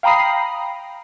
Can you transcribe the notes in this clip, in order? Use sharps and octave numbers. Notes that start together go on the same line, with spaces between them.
F5 G5 A#5 B5 D#6 C7